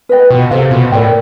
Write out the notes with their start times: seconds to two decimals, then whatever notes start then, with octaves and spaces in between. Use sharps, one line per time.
0.09 B4 D#5 G5
0.30 B2 F4
0.51 C3 A4 C5 F5
0.71 B2 F4
0.92 A2 A#4 D5 G5